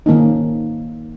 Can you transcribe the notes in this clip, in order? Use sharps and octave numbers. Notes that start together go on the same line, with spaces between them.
D#3 A#3 C#4 D#4